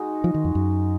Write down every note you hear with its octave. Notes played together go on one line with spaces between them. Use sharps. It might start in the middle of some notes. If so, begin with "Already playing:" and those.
Already playing: G#3 D#4 F#4
F3
D#3
F2
F#2